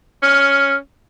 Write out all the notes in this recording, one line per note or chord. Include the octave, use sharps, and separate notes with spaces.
C#4 F6